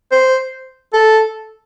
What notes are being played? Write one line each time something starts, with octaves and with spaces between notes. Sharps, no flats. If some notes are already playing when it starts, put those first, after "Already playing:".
C5
A4